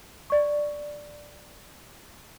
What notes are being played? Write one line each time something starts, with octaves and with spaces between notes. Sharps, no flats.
D5 C#6